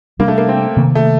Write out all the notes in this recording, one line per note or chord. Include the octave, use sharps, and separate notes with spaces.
C3 G3 A#3 D4
A3
A#3
C4
C3 D#3 A#3
A3